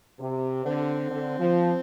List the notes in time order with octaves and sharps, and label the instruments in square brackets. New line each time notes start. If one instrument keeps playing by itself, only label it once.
[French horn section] C3
[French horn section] D3 [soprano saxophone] C4
[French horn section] D3
F3